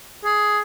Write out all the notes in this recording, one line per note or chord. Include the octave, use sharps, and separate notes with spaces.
G#4